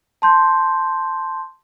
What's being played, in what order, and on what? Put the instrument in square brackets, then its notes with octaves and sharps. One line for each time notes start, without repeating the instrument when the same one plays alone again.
[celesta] A5 C6 G6